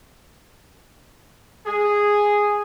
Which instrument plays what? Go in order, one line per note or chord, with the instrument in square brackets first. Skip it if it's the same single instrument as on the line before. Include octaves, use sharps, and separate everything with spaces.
[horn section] G#4